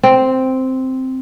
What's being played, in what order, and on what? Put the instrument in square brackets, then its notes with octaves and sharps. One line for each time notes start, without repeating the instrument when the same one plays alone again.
[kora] C4